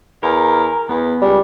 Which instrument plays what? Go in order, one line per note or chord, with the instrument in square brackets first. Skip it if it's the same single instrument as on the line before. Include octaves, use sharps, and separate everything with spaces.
[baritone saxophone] E2 [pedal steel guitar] A#4
[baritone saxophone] E2 [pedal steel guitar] B3
[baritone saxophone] C#2 [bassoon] G3